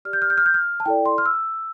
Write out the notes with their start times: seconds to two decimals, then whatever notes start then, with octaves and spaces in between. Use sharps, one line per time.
0.05 G4 D5 F6
0.13 G6
0.22 F6
0.30 G6
0.38 F6
0.46 G6
0.54 F6
0.80 A5
0.86 E4 A4 D5 G5
1.06 C6
1.18 F6
1.26 E6